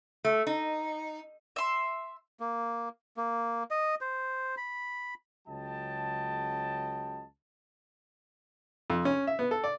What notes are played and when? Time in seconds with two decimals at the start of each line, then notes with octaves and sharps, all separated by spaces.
0.25 A3
0.47 D#4
1.56 E5 C6
2.40 A#3
3.17 A#3
3.71 D#5
4.01 C5
4.57 B5
5.48 C#2 C#3 F#3 D#5 G5 A5
8.90 F2
9.05 C#4
9.27 E5
9.39 B3
9.51 A4
9.64 D5